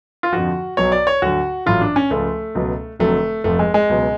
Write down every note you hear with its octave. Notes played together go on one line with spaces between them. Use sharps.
F4
F2 D3 F3 F#4
B1 B2 F#3 C#5
D5
C#5
D2 D3 F#3 F#4
A1 A2 F#3 F4
D4
C#4
C#2 C#3 F3 A3
C#2 B2 F#3
F1 F2 D3 F#3 A3
F1 F2 F3 A3
G#3
G#3
C#2 B2 F#3